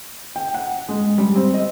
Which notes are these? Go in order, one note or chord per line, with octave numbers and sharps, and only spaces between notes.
G5
F#5
G#3
G3
C4
D#5